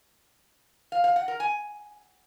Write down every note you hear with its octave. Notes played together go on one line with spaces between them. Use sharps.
F5
F5
F#5
A#4
G#5